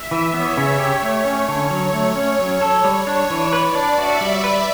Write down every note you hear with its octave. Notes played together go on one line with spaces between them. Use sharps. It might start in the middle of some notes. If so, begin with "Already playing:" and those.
Already playing: E5
E3
B3 C#5
C#3
G4
A3
C#4
D3
F#3 C#5
A3
C#4
F#3
A4
G3
D4 C#5
E3
B4 D5
D4
F#4 E5
G3
B4